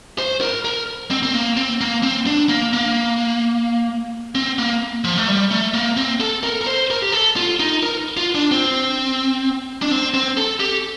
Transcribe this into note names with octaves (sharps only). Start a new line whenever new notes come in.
C5
A#4
A#4
C4
C4
A#3
C4
A#3
C4
D4
A#3
A#3
C4
A#3
F3
A3
G3
A3
A#3
C4
A4
A#4
A#4
C5
A#4
G4
A4
F4
D#4
A#4
F4
D4
C4
D4
C4
C4
A4
G4